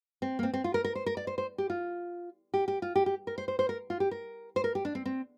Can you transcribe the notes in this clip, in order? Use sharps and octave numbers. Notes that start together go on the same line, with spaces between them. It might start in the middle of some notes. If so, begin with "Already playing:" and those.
C4
A#3
C4
C4
F4
A#4
A#4
C5
A#4
D5
C5
C5
G4
F4
G4
G4
F4
G4
G4
A#4
C5
C5
C5
A#4
F4
G4
A#4
C5
A#4
G4
D4
C4
C4